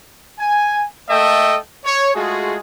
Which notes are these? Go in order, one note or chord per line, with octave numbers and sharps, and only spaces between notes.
G#5
A3 A#3 A4 D#5 E5 G5
C#5
G#3 A3 F4 F#4 G#4